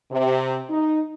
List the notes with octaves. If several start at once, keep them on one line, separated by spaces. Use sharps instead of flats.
C3
D#4